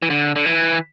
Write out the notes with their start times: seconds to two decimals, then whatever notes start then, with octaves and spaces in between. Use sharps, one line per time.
0.02 E3
0.10 D3
0.36 D3
0.46 E3